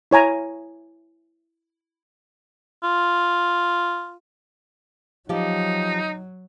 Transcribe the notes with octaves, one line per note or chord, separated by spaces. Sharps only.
E4 C#5 G#5 A#5
F4
F3 F#3 D#4 G4